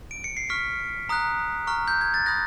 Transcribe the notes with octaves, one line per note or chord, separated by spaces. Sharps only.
D7
C#7
C7
C#6 F6 B6
A#5 D#6 F#6
A#5 C#6 F6
G6
G#6
A6
B5 D#6 F#6 A#6